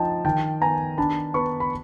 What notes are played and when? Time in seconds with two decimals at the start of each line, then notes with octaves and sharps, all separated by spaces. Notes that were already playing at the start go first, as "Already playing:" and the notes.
Already playing: F3 D#4 G5 A5
0.25 D#3 G5 A5
0.61 B3 G#5 A#5
0.98 D4 A5 B5
1.34 B3 B5 C#6
1.60 B5